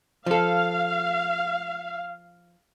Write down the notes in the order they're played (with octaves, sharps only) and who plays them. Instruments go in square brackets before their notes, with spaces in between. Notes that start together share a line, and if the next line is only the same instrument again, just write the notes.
[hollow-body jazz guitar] F3 A4 [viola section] F5